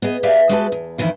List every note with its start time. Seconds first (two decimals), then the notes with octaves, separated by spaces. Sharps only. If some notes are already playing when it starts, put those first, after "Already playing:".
0.02 B3 G#4 D#5
0.23 G4 B4 D5 E5 F5
0.49 G#3 F#4 G4 B4 E5 A5
0.72 E2
0.98 F2 D#3 E3 E4